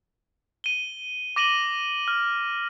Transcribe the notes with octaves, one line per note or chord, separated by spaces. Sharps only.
D#7 G7
D6 A#6 D#7 F#7 G7
F6